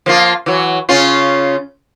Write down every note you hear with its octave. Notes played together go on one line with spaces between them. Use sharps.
F3 A#3 F4
E3 F#3
C#3 C#4 F4